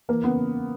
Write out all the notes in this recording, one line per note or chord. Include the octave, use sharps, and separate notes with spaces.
E3 A#3
C#3 B3